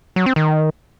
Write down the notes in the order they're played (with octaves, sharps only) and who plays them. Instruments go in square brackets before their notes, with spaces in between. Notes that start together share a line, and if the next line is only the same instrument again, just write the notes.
[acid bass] F#3
C4
D#3